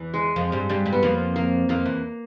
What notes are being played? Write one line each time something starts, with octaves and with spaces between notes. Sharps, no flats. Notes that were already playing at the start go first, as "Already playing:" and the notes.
Already playing: E2 E3
G#3
F2 F3
G2 G3
G2 G3
G2 G3
B3
F2 F3 A#3
A#3
F2 F3 A#3
E2 E3